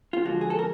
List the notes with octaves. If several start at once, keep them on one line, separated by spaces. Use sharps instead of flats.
F4
D3 F3 G#3 F#4
G#4
A4
A#4